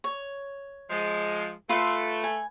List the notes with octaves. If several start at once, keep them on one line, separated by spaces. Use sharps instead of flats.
C#5
F3 G#3
A3 F4 B4 C6
G#5